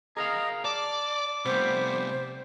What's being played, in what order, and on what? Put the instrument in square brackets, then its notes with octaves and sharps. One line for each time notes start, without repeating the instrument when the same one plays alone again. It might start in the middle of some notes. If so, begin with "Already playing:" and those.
[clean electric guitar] G#4 A#4 F5 [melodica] D#5 A#5
[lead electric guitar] D5 [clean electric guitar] A5 [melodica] D6
[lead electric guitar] C3 A3 [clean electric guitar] G3 B3 [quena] C5